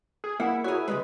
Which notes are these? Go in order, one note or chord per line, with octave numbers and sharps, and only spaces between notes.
G#4
A#3 E4 F#5
F#4 G#4 A#4 C#5
C#3 G3 G#3 B4